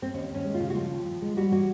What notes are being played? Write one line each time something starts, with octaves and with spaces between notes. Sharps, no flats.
C4
D#2 C#4
D#2 C#4
G#3
F4
C#3
F#4
F3 F4
D#2
F3
G#3
G3 F#4
E3 F#4